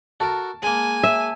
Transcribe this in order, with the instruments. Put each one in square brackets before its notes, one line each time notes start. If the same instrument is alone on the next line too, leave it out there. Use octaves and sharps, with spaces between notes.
[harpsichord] F#4 A4 A#4 [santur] A5
[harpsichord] G#3 A#3 [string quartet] G#5
[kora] E5